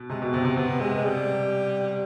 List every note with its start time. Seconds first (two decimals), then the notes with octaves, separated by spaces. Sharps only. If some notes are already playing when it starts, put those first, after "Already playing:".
Already playing: B2
0.09 C3 G#3
0.22 B2
0.33 C3 C4
0.45 C3
0.57 C3 B3
0.80 C3 G#3
1.04 G3